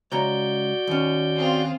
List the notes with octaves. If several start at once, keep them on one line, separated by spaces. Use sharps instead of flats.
C#2 F#4 C#5 D5 A#5 G6
D#2 C#4
C4 F4 G#4